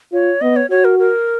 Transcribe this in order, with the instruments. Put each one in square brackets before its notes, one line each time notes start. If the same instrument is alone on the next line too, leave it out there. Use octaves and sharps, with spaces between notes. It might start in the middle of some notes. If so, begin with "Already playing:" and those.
[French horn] F4 [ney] C#5
[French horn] B3 [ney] D#5
[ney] C#5
[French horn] F#4 [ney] C#5
[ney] A#4
A#4